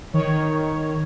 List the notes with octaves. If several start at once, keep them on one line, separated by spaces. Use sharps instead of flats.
D#3 C#5